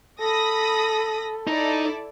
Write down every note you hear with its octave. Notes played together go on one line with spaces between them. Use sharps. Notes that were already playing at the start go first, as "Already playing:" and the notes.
A4 B5 D#6 A#6
D#4 E4 A4 D5